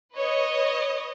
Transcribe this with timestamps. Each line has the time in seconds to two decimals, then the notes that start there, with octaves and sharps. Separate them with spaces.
0.17 B4 C#5 D#5